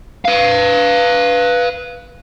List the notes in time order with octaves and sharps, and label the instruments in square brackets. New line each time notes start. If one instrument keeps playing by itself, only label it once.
[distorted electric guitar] B4 F5